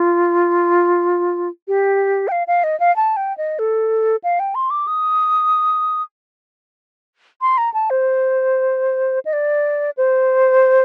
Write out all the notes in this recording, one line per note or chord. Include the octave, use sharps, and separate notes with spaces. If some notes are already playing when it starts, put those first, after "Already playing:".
Already playing: F4
G4
G5
F5
F5
D#5
F5
A5
G5
D#5
A4
F5
G5
C6
D6
D#6
C6
A#5
A5
C5
D#5
D5
C5